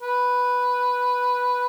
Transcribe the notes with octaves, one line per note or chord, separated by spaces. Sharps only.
B4